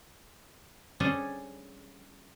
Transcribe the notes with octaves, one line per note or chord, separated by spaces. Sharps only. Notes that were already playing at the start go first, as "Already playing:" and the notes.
G3 C#4 D4 G#4 A4 C5